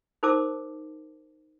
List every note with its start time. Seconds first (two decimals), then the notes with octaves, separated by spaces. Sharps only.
0.23 D#4 A#4 C5 A5 D6 E6